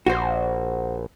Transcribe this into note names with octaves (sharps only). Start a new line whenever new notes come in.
A#1 F#4 C5